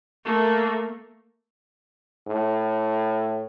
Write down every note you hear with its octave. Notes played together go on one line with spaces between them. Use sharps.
A3 A#3
A2